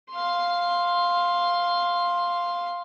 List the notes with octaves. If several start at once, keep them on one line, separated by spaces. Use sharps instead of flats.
F5 C6